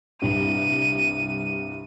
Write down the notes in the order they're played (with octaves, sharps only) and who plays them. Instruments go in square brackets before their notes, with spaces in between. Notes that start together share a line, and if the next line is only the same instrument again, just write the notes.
[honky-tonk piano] C2 G2 [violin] D#7